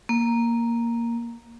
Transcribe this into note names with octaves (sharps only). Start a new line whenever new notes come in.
A#3